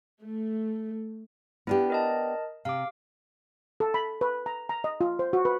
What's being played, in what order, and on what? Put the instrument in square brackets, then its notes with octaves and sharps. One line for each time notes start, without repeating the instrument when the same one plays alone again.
[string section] A3
[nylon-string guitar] B3 D4 G4 [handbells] E4
[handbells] A#4 D#5 A5
[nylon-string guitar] C3 [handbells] F5 D6
[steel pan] A4
B5
B4
A#5
A#5
D#5
F4
C5
F#4
B4